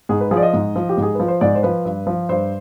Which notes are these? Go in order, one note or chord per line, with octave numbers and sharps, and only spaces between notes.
G#2 G#4
B4
F3 G#4
D5
D#5
G#2
F3
G4
G#2 G#4
F3 B4
C5
G#2 D5
C5
F3 B4
G2
F3
G2 C5